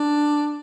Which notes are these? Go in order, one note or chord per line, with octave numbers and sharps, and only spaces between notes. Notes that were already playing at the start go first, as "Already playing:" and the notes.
Already playing: D4